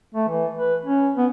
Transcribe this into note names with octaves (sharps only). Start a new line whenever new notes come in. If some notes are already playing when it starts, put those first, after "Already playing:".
A3
E3
B4
C#4
B3